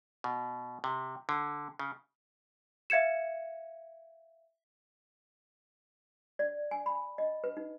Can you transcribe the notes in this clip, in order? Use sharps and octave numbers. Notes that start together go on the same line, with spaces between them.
B2
C3
D3
C#3
E5 F5 G#6 C#7 E7
D5
G#5
B5
D#5
B4
D#4